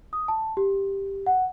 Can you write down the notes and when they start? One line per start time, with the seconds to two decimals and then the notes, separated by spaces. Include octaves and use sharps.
0.13 D#6
0.28 A5
0.57 G4
1.27 F#5